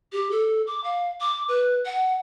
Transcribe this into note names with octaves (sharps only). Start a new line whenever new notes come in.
G4
A4
D6
F5
D6
B4
F#5